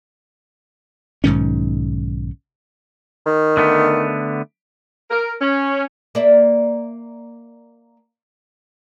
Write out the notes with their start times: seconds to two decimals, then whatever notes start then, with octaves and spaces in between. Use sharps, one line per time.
1.24 B1 G#2 D#3 C#4
3.26 D#3
3.57 D3 A3 B3
5.10 A#4
5.40 C#4
6.15 A#3 D5 E5